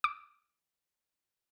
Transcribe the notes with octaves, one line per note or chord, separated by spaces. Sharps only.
D6